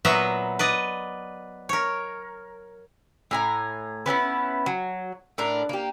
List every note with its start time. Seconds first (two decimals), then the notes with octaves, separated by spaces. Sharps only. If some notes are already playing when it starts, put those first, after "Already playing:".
0.05 A#2 F#3 B3 B4 E5 A#5
0.59 B4 D5 D#5
1.69 A#4 C#5
3.31 A2 G#5 A#5
4.06 B3 C#4 E4 B4
4.66 F#3
5.38 A2 D4 A#4
5.69 A#3 G4